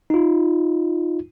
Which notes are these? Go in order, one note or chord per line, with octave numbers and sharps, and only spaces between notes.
D#4 F4